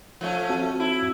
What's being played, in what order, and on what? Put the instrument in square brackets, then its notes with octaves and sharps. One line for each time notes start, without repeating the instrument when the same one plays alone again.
[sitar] F3 A3 C#4
[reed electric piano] C4 F#4 A5
[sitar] E4